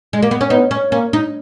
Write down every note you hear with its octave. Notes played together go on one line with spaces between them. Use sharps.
G#3
A#3
B3
C#4
B3 D#4
C#4
A#3 C#4
D#4